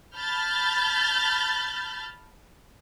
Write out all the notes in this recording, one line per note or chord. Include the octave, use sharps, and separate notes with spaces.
A5 B5 F6 G6 A6